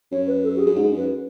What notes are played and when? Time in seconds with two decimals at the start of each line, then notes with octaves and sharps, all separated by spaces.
0.12 F#2 C#5
0.27 B4
0.44 A4
0.56 F#4
0.59 G#4
0.66 F#2
0.75 G#2 G#4
0.91 F#2
0.97 B4